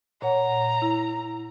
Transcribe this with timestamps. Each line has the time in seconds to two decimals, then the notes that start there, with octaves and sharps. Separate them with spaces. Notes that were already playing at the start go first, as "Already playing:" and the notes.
0.22 A#2 C#5 F#5 A#5
0.82 E4